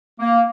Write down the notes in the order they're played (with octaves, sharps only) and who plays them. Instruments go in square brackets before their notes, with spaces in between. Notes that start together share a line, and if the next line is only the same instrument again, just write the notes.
[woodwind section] A#3